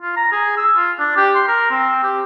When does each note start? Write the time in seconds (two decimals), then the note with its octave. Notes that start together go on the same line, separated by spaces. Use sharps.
0.02 F4
0.16 A#5
0.32 G#4
0.57 E6
0.76 F4
0.99 D4
1.17 G4
1.35 C6
1.48 A#4
1.71 C4
2.03 G4